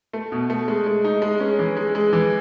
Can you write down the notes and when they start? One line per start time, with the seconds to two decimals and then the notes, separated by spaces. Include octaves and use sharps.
0.13 A3
0.32 B2
0.50 A3
0.68 G#3
0.86 G#3
1.04 D#4
1.22 G#3
1.40 C#4
1.59 E3
1.77 G#3
1.95 G#3
2.13 E3